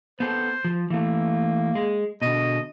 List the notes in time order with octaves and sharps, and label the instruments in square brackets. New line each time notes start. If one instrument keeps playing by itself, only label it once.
[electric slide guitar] B3 C4 A4 [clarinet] C5
[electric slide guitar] F3
[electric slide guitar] E3 A3 [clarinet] A#3
[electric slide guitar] G#3
[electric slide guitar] B2 D3 [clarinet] D#5